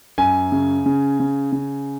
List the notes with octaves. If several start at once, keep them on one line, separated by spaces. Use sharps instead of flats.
F#2 G#5
C#3
C#3
C#3
C#3